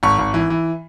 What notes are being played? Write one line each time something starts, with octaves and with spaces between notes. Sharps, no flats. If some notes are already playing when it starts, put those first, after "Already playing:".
G#1 C#6
G#1
E3
E3